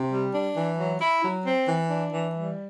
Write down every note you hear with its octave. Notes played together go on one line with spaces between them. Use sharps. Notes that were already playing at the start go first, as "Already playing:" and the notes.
Already playing: C3
G3
D4
E3
F#3
E4
F#3
C4
E3
D4
E3
G3